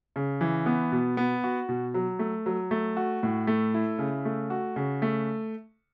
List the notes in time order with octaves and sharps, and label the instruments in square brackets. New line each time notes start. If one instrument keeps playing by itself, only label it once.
[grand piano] C#3
E3
B3
B2
B3
F#4
B2
F#3
A3
F#3
A3
F#4
A2
A3
E4
C#3
A3
F#4
C#3
A3